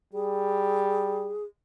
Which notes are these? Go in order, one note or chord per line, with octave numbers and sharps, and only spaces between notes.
G3 G#4